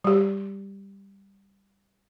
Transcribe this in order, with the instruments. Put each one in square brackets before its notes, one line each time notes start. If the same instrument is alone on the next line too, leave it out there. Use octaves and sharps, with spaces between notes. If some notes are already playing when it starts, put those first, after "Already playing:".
[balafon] G3 G4